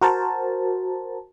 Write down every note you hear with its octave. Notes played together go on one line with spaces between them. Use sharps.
F#4 A#4 C5 A5